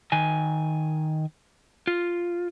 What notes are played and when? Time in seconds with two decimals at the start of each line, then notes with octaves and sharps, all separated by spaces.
0.12 D#3 G#5
1.87 F4